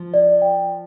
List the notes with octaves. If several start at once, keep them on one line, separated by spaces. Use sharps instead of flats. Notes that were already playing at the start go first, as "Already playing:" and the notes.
Already playing: F3
D5
G5